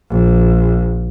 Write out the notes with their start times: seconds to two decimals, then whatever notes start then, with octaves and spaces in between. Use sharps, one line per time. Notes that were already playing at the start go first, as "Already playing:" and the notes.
0.10 A#1